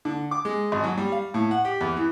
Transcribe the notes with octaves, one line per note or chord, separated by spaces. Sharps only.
D3
D6
G#3
G#1
F#3
G3
F5
A2
F#5
G4
E2
E3